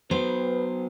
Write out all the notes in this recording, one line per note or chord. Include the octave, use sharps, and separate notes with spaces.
F#3 B3 B4 C5